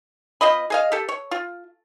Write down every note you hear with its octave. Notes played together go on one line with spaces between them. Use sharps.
C4 F4 D#5 B5
G#4 D#5 F5
G4 A4
C#5
F4